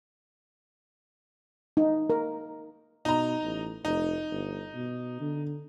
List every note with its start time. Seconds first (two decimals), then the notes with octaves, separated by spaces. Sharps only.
1.77 D#4
2.10 A#4
3.05 B2 D#4 A#5
3.43 A1
3.85 F1 D#4
4.31 G1
4.75 B2
5.21 D3